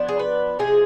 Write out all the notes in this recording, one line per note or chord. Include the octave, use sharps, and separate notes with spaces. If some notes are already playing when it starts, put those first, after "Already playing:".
Already playing: F3 B3 D4
G#4
B4
C3 F3 G#3 G#4